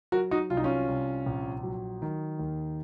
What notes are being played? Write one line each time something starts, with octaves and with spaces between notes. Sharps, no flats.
F#3 F#4 A#4
D#4 F#4
C2 F4
D#4
C#4 F4
C2
A#1
F#3
D#3
D#2